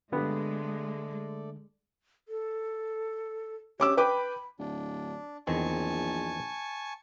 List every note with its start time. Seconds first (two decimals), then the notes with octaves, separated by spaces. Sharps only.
0.12 G2 D3 G#3 A3 B3 A4 D5
2.28 A4
3.80 C#4 G4 D6 E6
3.97 B4 G5 B5 D6
4.59 D1 D4
5.47 A#1 E2 D#3 C4 G#5 A5 C#6